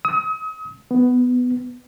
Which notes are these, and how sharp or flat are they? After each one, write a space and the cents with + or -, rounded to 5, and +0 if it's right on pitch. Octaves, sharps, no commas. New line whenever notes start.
D#6 +40
B3 +10